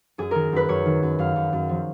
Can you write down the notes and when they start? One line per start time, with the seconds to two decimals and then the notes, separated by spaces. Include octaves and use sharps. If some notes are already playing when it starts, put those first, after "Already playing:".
0.18 F#2 G#4
0.31 D#3 A#4
0.52 F#2 B4
0.69 F#2 C#5
0.86 D#3
1.03 F#2
1.19 F#2 F5
1.36 F#2
1.53 F#2
1.69 F3